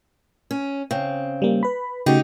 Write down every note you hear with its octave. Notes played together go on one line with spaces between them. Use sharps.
C#4
C#3 C4
G3 A#3
B4 B5
C#3 A3 D#4 F#4 G4